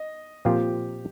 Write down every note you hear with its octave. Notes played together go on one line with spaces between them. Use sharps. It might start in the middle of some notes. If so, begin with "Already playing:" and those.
Already playing: D#5
A#2 F3 C4 F4 G4